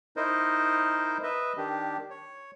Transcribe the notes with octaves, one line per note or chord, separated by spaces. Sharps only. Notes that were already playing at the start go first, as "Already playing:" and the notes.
D#4 E4 A#4 C5 D#5
B4 D#5 E5
D#3 D4 G4
C#5